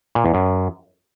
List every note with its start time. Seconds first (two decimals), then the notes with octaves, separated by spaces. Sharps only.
0.15 A#2
0.24 E2
0.34 F#2